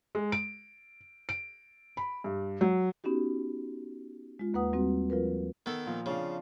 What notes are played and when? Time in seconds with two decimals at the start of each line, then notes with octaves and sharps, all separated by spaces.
0.15 G#3
0.32 D7
1.29 D7
1.97 B5
2.24 G2
2.61 F#3
3.04 B3 C#4 D#4 F#4 G4
4.39 G#3 F4
4.54 D#2 A#3 B4 F#5 D#6
4.73 G3 C4 F#4
5.10 F3 F4 A#4 B4
5.66 D#3 B3 A4
5.86 A#2 F3
6.06 C#3 C4 D4 F4